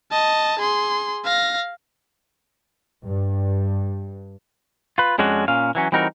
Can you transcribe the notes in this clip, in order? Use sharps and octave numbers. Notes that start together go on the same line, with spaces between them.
D#5 A5
G#4 C6
F5 A#6
G2
F4 B4
F2 G#3 C#4 D4 F#4
A#2 C#4 F5
E3 F#3 C#4
E3 G3 C4 D#4 F#4 A#4